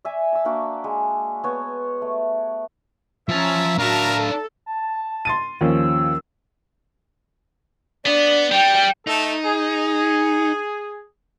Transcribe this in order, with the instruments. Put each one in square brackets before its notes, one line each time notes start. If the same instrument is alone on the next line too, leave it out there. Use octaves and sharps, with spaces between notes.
[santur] D5 E5 G#5
A5 E6
A#3 D4 F#4
G#3
B3 C#5
A3
[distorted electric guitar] F3 A5 [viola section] C#4 A#5 [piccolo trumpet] E5
[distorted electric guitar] D4 F5 [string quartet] F#4 E5 A#5 [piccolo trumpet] A#4 [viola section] A5
[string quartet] A4
[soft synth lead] A5
[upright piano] C6 A6 D#7
[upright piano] D#2 F3 C#4 [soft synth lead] E6
[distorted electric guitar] B3 [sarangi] D4
[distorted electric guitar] G3 [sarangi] G5
[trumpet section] A3 A4 [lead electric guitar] D#4
[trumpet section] G#4